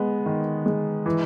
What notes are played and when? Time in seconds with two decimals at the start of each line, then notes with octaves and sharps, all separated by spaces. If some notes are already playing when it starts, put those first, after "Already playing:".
Already playing: G#3 B3
0.26 D#3
0.66 G#3
1.06 E3